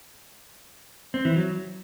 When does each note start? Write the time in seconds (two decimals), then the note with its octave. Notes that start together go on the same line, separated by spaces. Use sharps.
1.14 C4
1.25 E3
1.36 F#3